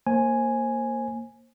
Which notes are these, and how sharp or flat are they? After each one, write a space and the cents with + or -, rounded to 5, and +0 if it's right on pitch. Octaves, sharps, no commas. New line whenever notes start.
A#3 -5 C5 +30 G#5 +0